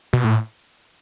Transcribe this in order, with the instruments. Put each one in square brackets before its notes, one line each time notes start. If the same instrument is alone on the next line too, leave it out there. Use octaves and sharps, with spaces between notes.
[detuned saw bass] B2
A2